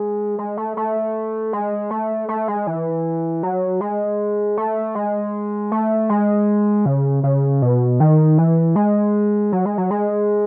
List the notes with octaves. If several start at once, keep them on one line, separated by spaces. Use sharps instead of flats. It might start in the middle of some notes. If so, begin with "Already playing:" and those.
Already playing: G#3
G#3
A3
A3
G#3
A3
A3
G#3
E3
F#3
G#3
A3
G#3
A3
G#3
C#3
C#3
B2
D#3
E3
G#3
F#3
G#3
F#3
G#3